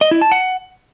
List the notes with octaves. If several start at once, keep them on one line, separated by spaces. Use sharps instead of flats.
D#5
E4
A5
F#5